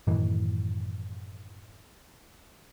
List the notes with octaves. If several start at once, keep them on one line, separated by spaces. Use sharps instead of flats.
F#2 A2 D#3 E3